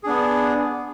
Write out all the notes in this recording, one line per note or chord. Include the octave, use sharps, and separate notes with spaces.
B3 D4 G#4